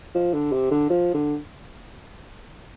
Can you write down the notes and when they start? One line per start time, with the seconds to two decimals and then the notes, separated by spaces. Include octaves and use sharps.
0.15 F3
0.33 D3
0.52 C3
0.71 D3
0.90 F3
1.14 D3